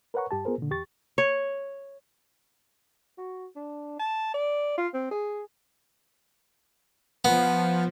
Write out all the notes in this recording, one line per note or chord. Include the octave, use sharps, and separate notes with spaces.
A#4 B4 C#5 F#5 A#5 C#6
G2 G4 A5
B3 F4 G#4 A#4 C5
A#2 D3
E2 G4 C#6 A6
C#5
F#4
D4
A5
D5
F4
C4
G#4
F3 B3